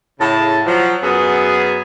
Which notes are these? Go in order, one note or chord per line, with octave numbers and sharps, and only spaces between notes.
A2 C#3 A5
F3 F#3
F#2 B3 G#4